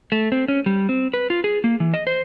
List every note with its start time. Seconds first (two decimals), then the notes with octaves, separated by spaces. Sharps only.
0.12 A3
0.32 C4
0.48 C#4
0.66 G3
0.89 C4
1.14 B4
1.30 F4
1.44 G#4
1.64 A#3
1.80 E3
1.94 D#5
2.07 C5